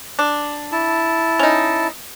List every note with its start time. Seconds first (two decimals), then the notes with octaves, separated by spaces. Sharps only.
0.19 D4
0.72 E4 A5
1.39 C#4 D#4